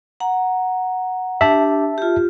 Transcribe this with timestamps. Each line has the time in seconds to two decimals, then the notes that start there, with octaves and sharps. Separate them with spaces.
0.20 F#5 A#5
1.41 D4 G4 E5 A5
1.98 F4 G4